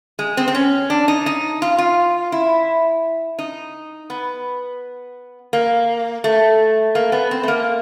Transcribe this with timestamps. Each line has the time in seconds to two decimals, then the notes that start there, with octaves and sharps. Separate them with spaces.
0.19 G#3
0.37 C4
0.48 C4
0.55 C#4
0.90 D4
1.08 D#4
1.26 D#4
1.62 F4
1.78 F4
2.32 E4
3.39 D#4
4.10 B3
5.53 A#3
6.24 A3
6.95 A#3
7.12 B3
7.31 C4
7.43 A3
7.48 A#3